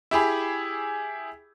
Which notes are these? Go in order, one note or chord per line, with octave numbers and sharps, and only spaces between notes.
E4 G4 G#4 B5